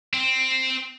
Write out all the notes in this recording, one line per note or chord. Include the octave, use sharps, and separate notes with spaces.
C4